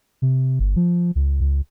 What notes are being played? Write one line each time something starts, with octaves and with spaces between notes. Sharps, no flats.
C3
G1
F3
C#2
C#2